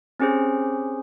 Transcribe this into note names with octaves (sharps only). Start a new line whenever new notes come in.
C4 C#4 G4 G#4 C5